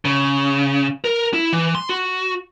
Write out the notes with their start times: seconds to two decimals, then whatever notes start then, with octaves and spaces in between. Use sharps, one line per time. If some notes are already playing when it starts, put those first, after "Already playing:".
0.05 C#3
1.04 A#4
1.33 E4
1.52 E3
1.75 C6
1.89 F#4